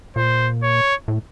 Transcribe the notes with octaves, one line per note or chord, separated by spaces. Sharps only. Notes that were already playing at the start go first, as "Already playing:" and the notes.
A#2 C5
C#5
A2